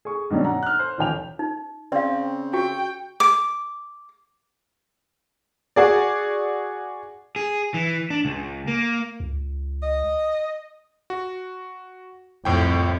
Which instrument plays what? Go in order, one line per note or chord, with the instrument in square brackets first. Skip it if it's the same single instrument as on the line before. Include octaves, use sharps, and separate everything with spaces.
[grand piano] G#4 C#6
G2 B2 D#3 F#3 C#4 D4
F#5 A#5
F6 F#6
C5
D#1 A1 G5 F7
[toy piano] D#4
[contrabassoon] C#3 [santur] C4 [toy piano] D5 F5
[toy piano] F#4 [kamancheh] G5 [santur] C#6
[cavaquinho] D6
[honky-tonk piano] F#4 G#4 D5
[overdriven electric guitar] G#4
E3
D4
C#2
A#3
[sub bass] C#2
[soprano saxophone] D#5
[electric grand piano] F#4
[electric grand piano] C2 A2 G5 [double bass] F2